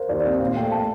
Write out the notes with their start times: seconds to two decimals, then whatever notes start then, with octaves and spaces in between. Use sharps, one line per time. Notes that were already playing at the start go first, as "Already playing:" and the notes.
Already playing: A#4 C5 F5
0.09 D#2 D5
0.25 C4
0.40 A#2 F5
0.56 A3 G5
0.72 A5